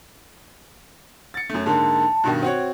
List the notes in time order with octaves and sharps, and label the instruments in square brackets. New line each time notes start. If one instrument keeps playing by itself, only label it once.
[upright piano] A6 C#7
F#2 A3
[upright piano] G#2 D3 A#3 [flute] A5
[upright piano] G2 B2 D#3
C4 F#4 C#5